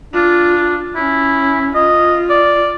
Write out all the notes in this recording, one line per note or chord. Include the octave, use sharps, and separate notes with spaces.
D4 F4
C#4 E4
F4 D#5
D5